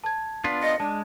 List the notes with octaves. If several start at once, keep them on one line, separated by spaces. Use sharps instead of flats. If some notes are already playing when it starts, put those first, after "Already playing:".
A5 G#6
B3 D4 F4 B6
D#5 A#6 C#7
G#3 D4 A5